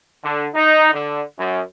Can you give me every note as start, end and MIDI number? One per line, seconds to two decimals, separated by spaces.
0.23 0.45 50
0.54 0.91 63
0.91 1.20 50
1.37 1.59 42